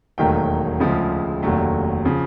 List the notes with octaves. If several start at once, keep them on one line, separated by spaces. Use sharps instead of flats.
E1 D#2 D#3 F#3 A3 G5
D2 C#3 F3 G#3
F1 D#2 D3 F#3 A3
C#3 F3